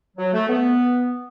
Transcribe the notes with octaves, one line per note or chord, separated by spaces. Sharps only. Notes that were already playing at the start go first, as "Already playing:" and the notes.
F#3
A3
B3